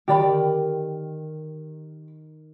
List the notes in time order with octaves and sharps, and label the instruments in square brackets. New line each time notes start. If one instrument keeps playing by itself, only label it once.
[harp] D#3 [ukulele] G4 D5 B5